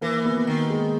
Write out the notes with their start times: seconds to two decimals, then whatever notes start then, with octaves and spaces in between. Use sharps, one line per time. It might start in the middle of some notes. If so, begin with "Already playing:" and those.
0.01 E3 A#3
0.25 B3
0.46 D#3 B3
0.69 G#3